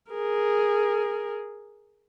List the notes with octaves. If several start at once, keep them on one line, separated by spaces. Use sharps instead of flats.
G#4 A#4